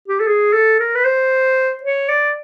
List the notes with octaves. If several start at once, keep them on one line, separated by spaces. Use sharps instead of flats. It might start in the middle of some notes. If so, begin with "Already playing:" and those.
G4
A4
G#4
A4
A#4
B4
C5
C#5
D5